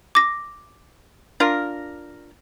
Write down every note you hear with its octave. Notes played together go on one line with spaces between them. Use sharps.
D6 A#6
D4 F4 A#4